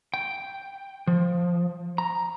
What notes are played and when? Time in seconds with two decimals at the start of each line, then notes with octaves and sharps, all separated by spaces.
0.14 G5
1.07 F3
1.98 A#5